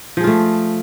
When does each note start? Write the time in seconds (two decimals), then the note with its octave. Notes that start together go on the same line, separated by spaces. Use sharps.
0.17 F3
0.20 G#4
0.24 F4
0.27 A3